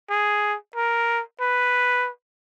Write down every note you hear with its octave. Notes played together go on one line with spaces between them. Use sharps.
G#4
A#4
B4